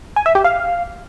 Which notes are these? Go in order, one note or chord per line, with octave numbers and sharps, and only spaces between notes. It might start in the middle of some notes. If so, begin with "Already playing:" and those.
G#5
E5
G4
F5